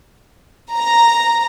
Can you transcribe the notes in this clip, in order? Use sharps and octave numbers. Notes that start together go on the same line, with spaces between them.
A#5